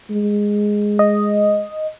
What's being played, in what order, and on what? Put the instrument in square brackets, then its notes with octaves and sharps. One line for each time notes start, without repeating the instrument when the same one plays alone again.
[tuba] G#3
[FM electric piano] D#5